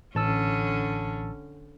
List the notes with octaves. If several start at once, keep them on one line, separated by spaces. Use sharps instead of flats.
A1 D3 C#4 A5 E6